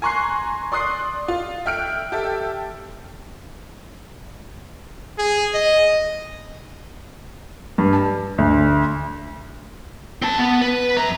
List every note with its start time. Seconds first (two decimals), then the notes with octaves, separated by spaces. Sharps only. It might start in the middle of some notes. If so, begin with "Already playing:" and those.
0.02 G#5 A#5 C6 C#6 F#6 C7
0.72 D5 C6 D#6 F#6 C7
1.28 F4
1.66 E5 G5 F6 F#6 D7
2.12 G4 A4 E5
5.18 G#4
5.54 D#5
7.78 G2
7.93 A5
8.38 D2
10.22 C4 A5
10.38 B3
10.61 B4
10.96 F#2 A#5